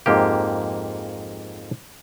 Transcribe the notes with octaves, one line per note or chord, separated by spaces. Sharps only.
F2 G#2 A#3 G4